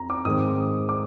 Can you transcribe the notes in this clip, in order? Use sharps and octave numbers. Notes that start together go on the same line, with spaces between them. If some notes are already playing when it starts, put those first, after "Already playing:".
Already playing: F2 A#5
D6
G#2 D#3 G#3 C4 D#6
D6